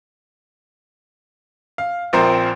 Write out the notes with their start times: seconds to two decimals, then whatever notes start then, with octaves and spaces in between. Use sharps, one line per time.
1.78 F5
2.13 A#1 F3 C4 A#4 C5